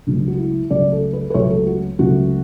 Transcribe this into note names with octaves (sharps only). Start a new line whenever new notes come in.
C#2 C#3 F#3 A3 D4
F#4
E4
C#2 C#3 F#3 A3 D5
A4
B4
B4
C#2 C#3 F#3 A3 C#5
A4
F#4
C#2 C#3 F#3 A3 F#4